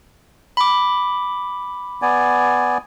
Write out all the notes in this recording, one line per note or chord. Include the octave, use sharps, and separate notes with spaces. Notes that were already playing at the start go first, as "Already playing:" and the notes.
B5 D6
B3 D5 G#5